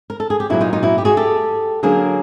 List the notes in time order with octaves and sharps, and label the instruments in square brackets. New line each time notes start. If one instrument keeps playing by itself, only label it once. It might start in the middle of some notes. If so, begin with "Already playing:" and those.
[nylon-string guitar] A#4
A4
G#4
G4
A#2 F#3 A#3 C#4 E4 F#4
D#4 F4
D#4 F4
E4 F#4
G4
F#4 G#4
G4 A4
D3 F#3 A#3 C#4 G#4 A#4